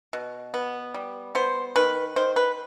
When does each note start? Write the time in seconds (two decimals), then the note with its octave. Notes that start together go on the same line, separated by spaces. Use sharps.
0.13 B2
0.54 B3
0.94 G3
1.35 B3 C5
1.76 D#3 B4
2.16 D#3 C5
2.36 B4